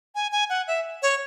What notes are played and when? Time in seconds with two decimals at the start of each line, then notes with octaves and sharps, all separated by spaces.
0.15 G#5
0.32 G#5
0.50 F#5
0.68 E5
1.03 C#5